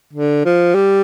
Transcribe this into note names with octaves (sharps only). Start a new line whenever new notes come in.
D3
F3
G3